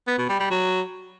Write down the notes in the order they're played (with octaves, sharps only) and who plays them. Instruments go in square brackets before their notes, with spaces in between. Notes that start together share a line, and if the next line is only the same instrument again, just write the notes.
[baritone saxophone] B3
B2
G3
G3
F#3